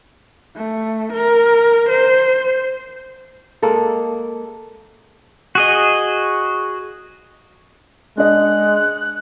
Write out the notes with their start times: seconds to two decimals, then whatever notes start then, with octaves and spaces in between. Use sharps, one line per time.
0.56 A3
1.12 A#4
1.89 C5
3.63 G#3 A#3 A4
5.55 F#4 G#4 D#5
8.17 G#3 D4 D#5 F#6